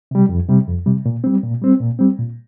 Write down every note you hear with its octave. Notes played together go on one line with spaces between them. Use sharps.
C3 G3
F2
C3 G3
F2
C3 G3
A#2
G3 C4
A#2
G3 C4
A#2
G3 C4
A#2